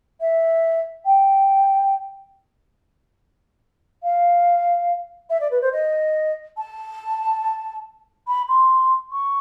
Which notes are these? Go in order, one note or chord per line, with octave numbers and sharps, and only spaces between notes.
E5
G5
F5
E5
D5
B4
C5
D#5
A5
B5
C6
C#6